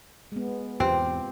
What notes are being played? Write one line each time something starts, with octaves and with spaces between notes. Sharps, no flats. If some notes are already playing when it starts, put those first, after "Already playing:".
G#3 B3
E2 G#2 C3 C4 F4 G4